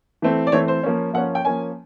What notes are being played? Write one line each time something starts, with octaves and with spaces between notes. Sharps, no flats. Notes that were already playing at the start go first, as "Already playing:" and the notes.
E3 A3 C4
D5
E3 A3 C4 C#5
C5
F3 A#3 C#4
F3 A#3 C#4 F#5
G5
F3 A#3 C#4 G#5